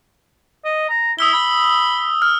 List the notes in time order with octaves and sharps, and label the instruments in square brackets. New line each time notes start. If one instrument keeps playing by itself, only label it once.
[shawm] D#5
A#5
[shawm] E4 [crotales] D#6 E6 G7
[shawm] B5
[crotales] F6